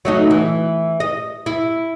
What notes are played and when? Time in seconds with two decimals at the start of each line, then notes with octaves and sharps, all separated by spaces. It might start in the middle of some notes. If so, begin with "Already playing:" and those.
0.05 F#3 A3 D#4
0.31 E3
1.00 D#5
1.46 E4